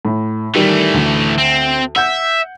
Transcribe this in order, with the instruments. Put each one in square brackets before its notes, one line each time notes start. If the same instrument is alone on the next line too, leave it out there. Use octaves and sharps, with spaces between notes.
[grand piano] A2
[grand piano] D#3 G3 A#4 [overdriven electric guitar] E3 A3
[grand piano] D2
[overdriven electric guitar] C4
[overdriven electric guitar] E5 [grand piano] F#5 G6